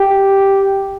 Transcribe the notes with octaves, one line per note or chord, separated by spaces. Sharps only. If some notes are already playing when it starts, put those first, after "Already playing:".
Already playing: G4